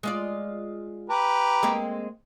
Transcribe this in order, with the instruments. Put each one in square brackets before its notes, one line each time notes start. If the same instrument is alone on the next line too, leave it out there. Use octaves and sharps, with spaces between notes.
[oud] G#3 F4 D5
[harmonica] G4 B4 A#5
[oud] G#3 A#3 C4